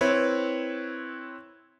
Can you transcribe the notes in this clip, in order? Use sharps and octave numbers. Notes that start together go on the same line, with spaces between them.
C4 E4 B4 C#5